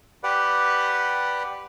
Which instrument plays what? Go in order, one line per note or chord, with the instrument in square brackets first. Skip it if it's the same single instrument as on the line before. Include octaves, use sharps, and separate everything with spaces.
[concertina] G4 B4 D5 F#5